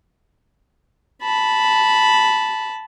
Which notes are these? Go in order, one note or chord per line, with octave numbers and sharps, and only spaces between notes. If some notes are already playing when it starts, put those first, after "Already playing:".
A5 B5